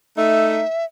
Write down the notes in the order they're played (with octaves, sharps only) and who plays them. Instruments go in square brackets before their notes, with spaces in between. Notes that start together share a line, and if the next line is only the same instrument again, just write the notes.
[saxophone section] A3 D#4 [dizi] E5